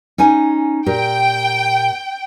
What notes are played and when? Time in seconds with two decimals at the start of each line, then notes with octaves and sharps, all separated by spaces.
0.18 C#4 D#4 G#5
0.86 A#2 G4 A#4 G5